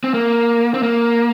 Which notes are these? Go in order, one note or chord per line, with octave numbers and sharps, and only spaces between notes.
C4
A#3
C4
A#3